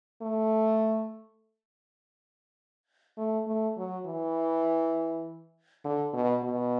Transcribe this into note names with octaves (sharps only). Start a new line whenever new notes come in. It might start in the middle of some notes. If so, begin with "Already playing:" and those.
A3
A3
A3
F#3
E3
D3
B2
B2